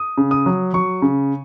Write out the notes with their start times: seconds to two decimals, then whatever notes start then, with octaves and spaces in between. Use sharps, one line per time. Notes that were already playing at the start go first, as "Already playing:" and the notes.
Already playing: D#6
0.18 C#3
0.31 D#6
0.46 F#3
0.74 F#3 C#6
1.02 C#3